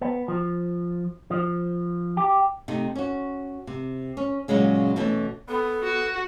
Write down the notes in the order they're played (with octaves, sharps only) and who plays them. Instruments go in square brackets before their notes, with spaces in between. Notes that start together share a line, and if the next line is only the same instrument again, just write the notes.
[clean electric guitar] B3
F3
F3
G4
[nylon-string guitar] C3 A3 D#4
C#4 F#4
C3
C#4
A#2 C#3 F#3 G#3 C#4
B2 E3 A3 C#4
[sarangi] B3 [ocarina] A4
[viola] F#4